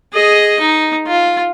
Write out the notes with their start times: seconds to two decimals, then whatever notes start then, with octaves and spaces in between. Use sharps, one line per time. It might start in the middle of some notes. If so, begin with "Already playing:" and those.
0.13 G#4 D#5
0.60 D#4
1.07 F4